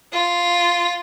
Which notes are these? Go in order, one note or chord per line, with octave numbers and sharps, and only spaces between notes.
F4